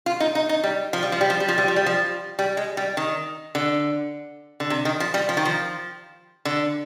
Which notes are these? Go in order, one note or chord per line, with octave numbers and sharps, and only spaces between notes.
F4
D#4
D#4
D#4
G3
F3
G3
F3
G3
F3
G3
F3
G3
F3
G3
F3
G3
G#3
G3
D#3
D3
D3
C3
D#3
F3
G3
F3
D#3
F3
D3